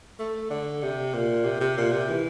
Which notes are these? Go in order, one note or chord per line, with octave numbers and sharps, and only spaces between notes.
A3
D3
C3
A#2
C3
C3
A#2
C3
E3